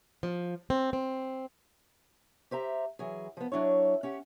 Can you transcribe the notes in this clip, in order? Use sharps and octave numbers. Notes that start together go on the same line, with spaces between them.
F3
C4
C4
G4 C5 E5 A#5
E3 F#3 G#4
F3 B3
F#3 D4 E4 C#5
C#4 G4 F#5